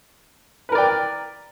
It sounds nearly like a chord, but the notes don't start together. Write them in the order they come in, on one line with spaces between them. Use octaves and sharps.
B4 A#4 D5 G5